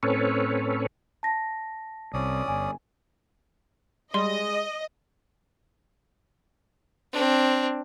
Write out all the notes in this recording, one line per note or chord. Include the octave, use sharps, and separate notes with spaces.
A2 C4 C#4 A4 B4 C#5
A5 A#6
C2 C#4 D5 D#6
G1 G#5
G3 G#3 D#5 C6
C4 D4